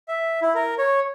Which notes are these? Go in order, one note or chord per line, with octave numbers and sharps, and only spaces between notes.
E5
E4
A#4
C#5